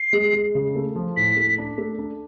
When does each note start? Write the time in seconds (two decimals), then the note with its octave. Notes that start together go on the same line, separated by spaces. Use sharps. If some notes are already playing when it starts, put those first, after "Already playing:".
Already playing: C7
0.13 G#3
0.33 G#3
0.55 C#3
0.76 A3
0.95 F3
1.17 A2 B6
1.37 A3
1.58 D4
1.78 A3
1.99 D4